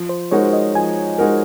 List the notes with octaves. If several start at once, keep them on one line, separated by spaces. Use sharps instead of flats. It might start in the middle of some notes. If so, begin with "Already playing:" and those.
Already playing: F3
C5
G#3 D#4 F#4 A#4 C#5
D#5
F3 G#5
G#3 D#4 F#4 A#4